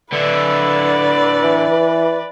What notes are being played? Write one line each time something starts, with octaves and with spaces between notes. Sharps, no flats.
D3 E4 B4 D5
E3